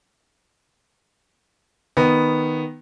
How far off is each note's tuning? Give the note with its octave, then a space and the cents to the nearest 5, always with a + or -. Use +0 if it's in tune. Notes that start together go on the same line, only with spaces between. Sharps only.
D#3 +0 B3 +0